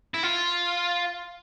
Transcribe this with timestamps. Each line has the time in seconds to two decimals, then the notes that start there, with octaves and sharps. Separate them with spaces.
0.14 E4
0.23 F4